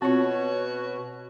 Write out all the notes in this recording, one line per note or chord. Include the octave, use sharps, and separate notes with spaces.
B2 C4 F4 F#4 C#5